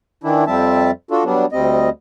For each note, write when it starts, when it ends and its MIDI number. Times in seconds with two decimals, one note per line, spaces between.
0.24 0.44 51
0.24 0.44 52
0.24 0.44 62
0.24 0.44 64
0.47 0.91 41
0.47 0.91 53
0.47 0.91 55
0.47 0.91 60
0.47 0.91 76
0.47 0.91 81
1.11 1.24 62
1.11 1.24 65
1.11 1.24 66
1.11 1.24 69
1.24 1.46 54
1.24 1.46 55
1.24 1.46 59
1.24 1.46 62
1.52 1.89 38
1.52 1.89 55
1.52 1.89 60
1.52 1.89 75